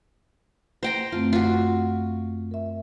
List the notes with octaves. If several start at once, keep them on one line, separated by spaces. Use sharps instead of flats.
C5 G5 A#5
F#2 A3 C4 F4
F4 F#4
A#4 E5